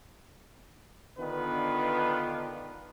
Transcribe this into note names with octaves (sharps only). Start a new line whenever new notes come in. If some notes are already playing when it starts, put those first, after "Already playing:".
D3 D#3 B3 D4 F4 B4